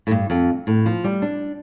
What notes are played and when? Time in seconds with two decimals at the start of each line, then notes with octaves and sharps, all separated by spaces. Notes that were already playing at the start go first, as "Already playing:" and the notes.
0.07 A2
0.11 G2
0.30 F2
0.67 A2
0.86 F3
1.04 G3
1.22 D4